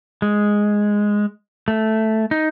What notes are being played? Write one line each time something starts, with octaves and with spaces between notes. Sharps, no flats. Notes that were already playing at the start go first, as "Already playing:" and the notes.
G#3
A3
D#4